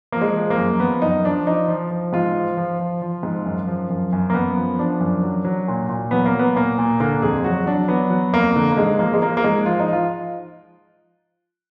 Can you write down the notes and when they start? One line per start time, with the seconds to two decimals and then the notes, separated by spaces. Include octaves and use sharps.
0.12 F3 A#3
0.21 G#3
0.37 F3
0.50 A#3
0.58 F#2
0.80 F3 B3
1.02 F#2 D#4
1.25 F3 D4
1.47 F3 D#4
1.68 F3
1.91 F3
2.13 G#2 F4
2.35 F3
2.57 F3
2.80 F3
3.02 F3
3.23 G#2
3.46 F#2
3.67 F3
3.90 F#2
4.12 F#2
4.30 A#3
4.34 F#2 B3
4.57 F3
4.79 F3 D4
5.00 F#2
5.23 F#3
5.45 F#3
5.68 A#2
5.89 A#2
6.11 F#3 B3
6.25 A#3
6.34 F#3
6.39 B3
6.55 A#2 A#3
6.78 A#2
7.00 D3 A#3
7.22 F2 G#4
7.44 F#3 F#4
7.66 F#3 D4
7.88 F#3 B3
8.10 F#3
8.33 F2 A#3
8.56 D3
8.72 A#3
8.77 G#2 G#3
8.99 F3 A#3
9.13 G#3
9.22 F3 A#3
9.37 A#3
9.44 G#2 G#3
9.66 F3 F4
9.80 D#4
9.89 F3 F4